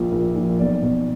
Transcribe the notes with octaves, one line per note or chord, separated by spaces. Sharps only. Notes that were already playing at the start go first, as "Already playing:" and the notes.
Already playing: A#1 A#2 F3
A#1
A#2 F3
B1 D5
B2